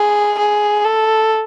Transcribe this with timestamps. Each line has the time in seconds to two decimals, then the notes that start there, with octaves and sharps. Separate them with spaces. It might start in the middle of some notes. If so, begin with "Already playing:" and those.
Already playing: G#4
0.38 G#4
0.85 A4